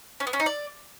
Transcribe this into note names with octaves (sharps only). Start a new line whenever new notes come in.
C#4
B3
C#4
D#4
D5